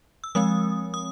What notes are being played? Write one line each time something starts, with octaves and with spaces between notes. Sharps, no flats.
E6
F3 G#3 C4 D#6
D#6